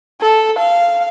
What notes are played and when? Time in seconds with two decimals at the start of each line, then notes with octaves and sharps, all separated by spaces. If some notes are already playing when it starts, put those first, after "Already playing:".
0.21 A4
0.58 F5